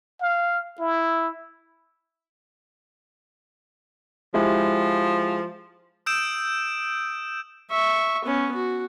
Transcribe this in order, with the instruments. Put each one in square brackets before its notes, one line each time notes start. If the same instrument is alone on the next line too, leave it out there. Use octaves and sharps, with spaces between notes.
[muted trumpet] F5
E4
[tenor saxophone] F3 [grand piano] G#3 E4 G4
[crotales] D#6 E6 G6 D7 E7
[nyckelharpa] E5 C#6
B3 C#4
F#4